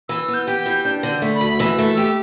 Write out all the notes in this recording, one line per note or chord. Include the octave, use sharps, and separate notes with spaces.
E3 E6
B3
G6
G4
G6
E3
D4 G6
D3
A3
B5
D2
E3 E6
A3
E6
G4